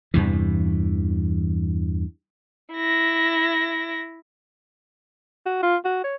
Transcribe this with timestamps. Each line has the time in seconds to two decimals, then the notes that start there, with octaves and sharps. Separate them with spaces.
0.14 E2 G2 C3 E3
2.74 E4 A#6
5.46 F#4
5.63 F4
5.85 F#4
6.04 C#5